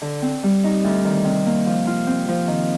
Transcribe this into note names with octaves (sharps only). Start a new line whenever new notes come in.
D3
C4
G3
D#4
D2
D#3
C3
A#3
F3
F4
C4
F3
D#3